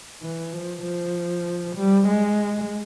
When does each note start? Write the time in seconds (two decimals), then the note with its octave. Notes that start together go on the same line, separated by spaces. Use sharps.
0.22 E3
0.53 F3
0.83 F3
1.76 G3
2.08 G#3